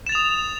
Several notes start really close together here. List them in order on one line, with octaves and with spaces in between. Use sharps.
E7 A6 F7 D#6